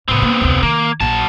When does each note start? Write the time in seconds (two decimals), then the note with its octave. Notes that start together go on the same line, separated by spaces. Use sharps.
0.08 A2 C#3 B3 C4
0.22 A#3
0.41 F1 D2
0.63 D#3 A#3
1.01 A#1 F#3 A5